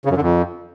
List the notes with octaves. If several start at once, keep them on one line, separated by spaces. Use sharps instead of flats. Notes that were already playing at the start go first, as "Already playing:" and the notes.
C#3
F#2
D3
F2